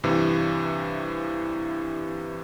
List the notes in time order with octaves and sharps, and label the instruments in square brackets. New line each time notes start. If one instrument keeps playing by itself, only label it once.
[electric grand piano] G2 C3 E3